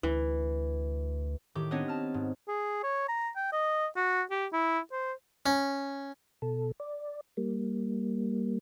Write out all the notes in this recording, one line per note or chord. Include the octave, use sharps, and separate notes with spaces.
D2 E3
A2 D#3 G4 D6
B3 C4 D4 D#4 C#5 D#5
A5 F6
G#2
G#4
C#5
A#5
G5
D#5
F#4
G4
E4
C5
C#4
B2 A4
D5
G3 A#3